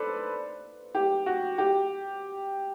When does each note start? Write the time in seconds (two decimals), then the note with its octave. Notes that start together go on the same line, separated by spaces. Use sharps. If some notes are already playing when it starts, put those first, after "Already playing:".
Already playing: A4 B4 C5 D5
0.95 G4
1.26 F#4
1.58 G4